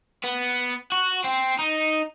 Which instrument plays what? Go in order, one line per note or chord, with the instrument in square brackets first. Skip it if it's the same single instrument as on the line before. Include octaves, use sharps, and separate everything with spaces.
[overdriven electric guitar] B3
F#4
C4
D#4